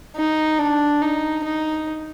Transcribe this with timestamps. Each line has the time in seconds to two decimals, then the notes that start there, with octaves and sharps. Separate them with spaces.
0.16 D#4
0.59 D4
1.02 D#4
1.44 D#4